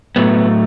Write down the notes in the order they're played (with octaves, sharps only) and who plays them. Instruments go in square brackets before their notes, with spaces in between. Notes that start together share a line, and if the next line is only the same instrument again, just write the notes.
[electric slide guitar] A2 F#3 A3 B3